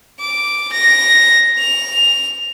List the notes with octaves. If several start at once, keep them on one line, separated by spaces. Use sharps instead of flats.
D6
A#6
F7